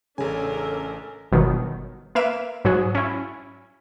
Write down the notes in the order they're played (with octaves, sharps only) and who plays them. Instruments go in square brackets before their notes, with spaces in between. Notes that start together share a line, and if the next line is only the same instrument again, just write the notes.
[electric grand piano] A1 G#5 [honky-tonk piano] C#3 [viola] D4 A#4 [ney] A4
[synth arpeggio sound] G1 B2 D#3 F#3
A#3 B4 E5 D7 E7
G#2 F#3 F#4 G#4
C#4 E4